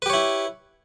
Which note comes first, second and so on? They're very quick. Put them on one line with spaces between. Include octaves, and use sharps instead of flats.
B4 G4 C#5 E4